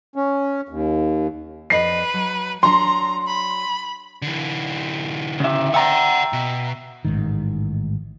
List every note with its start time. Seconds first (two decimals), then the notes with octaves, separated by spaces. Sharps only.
0.16 C#4
0.69 D#2
1.70 F2 B4 D5 D#5 C7
2.14 F#3
2.63 F#3 D4 A#5 C6
3.27 B5
4.22 D3 E3
5.40 C#3 E5
5.74 D5 E5 F#5 G5 A#5
6.33 B2
7.05 A1 G#2 D#3